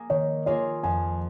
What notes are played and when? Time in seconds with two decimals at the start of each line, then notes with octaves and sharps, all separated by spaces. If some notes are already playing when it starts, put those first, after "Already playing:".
Already playing: A#3 G#4
0.10 D#3 C#5
0.46 A#3 F4 G#4 C#5
0.83 F2 G#5